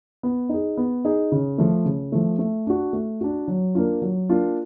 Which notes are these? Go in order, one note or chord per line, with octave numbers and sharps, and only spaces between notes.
B3
D#4 G#4
B3
D#4 G#4
C#3
F3 A3
C#3
F3 A3
A3
D4 F#4
A3
D4 F#4
F#3
A#3 D4 F4
F#3
A#3 D4 F4